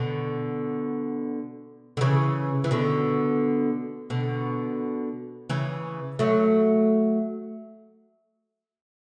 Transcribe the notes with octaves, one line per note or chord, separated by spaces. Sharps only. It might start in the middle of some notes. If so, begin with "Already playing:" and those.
Already playing: B2 D3
D3
C#3 E3
E3
B2 D3
B2 D3
C#3 E3
F#3 A3